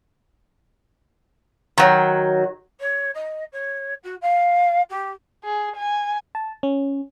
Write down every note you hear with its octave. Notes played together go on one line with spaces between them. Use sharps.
D#3 F#3
C#5
D#5
C#5
F#4
F5
G4
G#4
G#5
A5
C#4